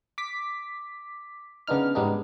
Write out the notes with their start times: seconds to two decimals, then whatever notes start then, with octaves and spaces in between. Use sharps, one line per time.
0.18 D6 B6
1.67 C#3 B3 D4 D#4 F6
1.95 G#2 G3 B3 D4 D#4